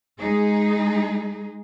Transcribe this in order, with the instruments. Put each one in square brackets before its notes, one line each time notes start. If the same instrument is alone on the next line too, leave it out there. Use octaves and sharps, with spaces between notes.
[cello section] G#3 D#4 G#4